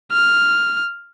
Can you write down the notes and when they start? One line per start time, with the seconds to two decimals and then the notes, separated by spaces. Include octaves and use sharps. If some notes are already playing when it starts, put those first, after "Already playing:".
0.13 F6